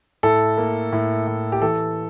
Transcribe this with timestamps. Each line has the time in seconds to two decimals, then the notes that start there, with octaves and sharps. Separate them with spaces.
0.23 A2 A4
0.58 A#3
0.93 A2
1.27 A2
1.52 G4
1.61 E3 A4